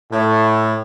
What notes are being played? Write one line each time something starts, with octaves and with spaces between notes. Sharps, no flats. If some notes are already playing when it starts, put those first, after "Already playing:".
A2